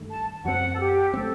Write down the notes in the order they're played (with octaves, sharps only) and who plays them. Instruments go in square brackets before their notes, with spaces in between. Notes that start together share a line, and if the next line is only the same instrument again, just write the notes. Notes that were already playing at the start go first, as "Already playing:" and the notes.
Already playing: [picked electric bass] G2 D#3 A3
[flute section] A5
[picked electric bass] F#2 F#3 A3 C4 [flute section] F#5
[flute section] A4
G4
[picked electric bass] F#3 A3 C4 [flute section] A4